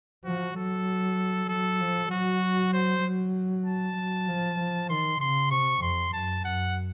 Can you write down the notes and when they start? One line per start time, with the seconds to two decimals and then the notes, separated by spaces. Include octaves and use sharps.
0.25 F3 F#4
0.56 F#3 A4
1.49 F#3 A4
1.80 F3
2.11 F#3 F#4
2.73 C5
3.03 F#3
3.66 A5
3.97 F#3
4.28 F3
4.59 F3
4.89 D#3 C6
5.20 C#3 C6
5.51 C3 C#6
5.82 F2 C6
6.13 F#2 A5
6.44 F#2 F#5